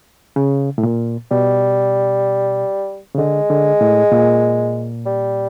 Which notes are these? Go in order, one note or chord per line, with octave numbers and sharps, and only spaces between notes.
C#3
A2
A#2
B2 G3
C#3
D3 G#3
D3
A2
A#2
G3